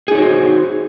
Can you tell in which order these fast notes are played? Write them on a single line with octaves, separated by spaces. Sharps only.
G#4 D#4 C#5 F#4 C5